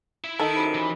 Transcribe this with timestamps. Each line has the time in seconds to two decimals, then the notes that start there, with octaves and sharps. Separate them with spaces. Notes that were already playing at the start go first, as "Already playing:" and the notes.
0.24 E4 E5
0.39 D#3 A4
0.56 F#2 C3 B5
0.74 E3